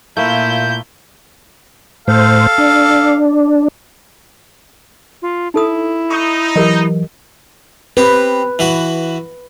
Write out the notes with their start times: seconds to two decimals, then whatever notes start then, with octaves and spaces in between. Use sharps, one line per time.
0.17 A#2 A3 A#3 E4 F4 G6
2.08 A2 A4 C5 F5
2.58 D4
5.22 F4
5.54 D#4 E4 A4 D#6
6.11 D#4 C#6
6.56 E3 F#3 G4 A#4 D#5
7.97 C4 G4 B4
8.59 E3 E4 F#4